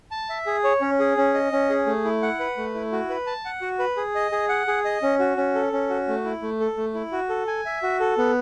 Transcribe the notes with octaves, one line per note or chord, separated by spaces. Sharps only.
A5
E5
G#4
C#5
C#4
G#4
C#4
D#5
C#4
G#4
A3
E4
F#5
B4
A3
E4
F#4
B4
A5
F#5
F#4
B4
G#4
D#5
G#4
F#5
G#4
D#5
C#4
F#4
C#4
A4
C#4
F#4
A3
E4
A3
A4
A3
E4
F#4
A4
G#5
E5
F#4
A4
B3